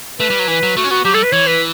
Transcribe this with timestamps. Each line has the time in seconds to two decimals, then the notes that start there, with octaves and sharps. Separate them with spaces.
0.20 A3 B4
0.30 G3
0.39 F#3
0.48 E3 B4
0.63 F#3
0.77 A3 F#4
0.84 C#4
0.91 B3 F#4
1.05 F#3 G4
1.14 G3 A4
1.23 B4
1.32 E3 C#5
1.47 B4